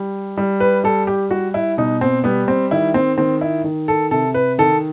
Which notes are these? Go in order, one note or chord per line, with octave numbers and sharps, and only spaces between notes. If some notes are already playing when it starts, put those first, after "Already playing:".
Already playing: G3
G3
B4
G3 A4
G4
G3 F#4
E4
B2 D#4
C4
G3 B3
C4
D#3 E4
C4
D#3 C4
E4
D#3
A4
C3 A4
B4
D#3 A4